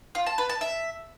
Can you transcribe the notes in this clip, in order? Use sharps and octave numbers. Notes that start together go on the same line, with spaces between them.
F4
A5
B4
A5
E5